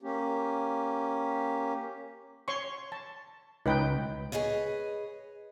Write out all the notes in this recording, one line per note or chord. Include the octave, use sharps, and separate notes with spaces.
A#3 C#4 G4
C#5 C6 C#6
A5
C#2 D#4 B4 G5
G#4 B4 C#5 D#5